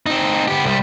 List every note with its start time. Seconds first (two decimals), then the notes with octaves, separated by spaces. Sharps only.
0.06 C4 D#4
0.48 B3 G4
0.64 C2 G3